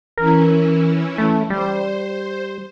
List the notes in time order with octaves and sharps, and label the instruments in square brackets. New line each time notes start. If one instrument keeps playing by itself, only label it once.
[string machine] E3 C#4 E4 [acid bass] A#4
[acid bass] A3
[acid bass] G3 [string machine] C5